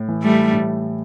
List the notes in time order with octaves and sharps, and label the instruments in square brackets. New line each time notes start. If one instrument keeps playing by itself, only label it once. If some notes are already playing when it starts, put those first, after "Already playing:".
Already playing: [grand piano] A2
E3
[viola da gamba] G3 A3
[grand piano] A2